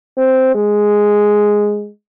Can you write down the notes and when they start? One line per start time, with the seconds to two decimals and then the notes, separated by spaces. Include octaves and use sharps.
0.17 C4
0.55 G#3